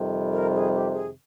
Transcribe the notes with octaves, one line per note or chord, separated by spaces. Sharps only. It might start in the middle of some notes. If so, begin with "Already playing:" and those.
Already playing: F2 C3 D#3 G3
A#4
G#4
G4
G#4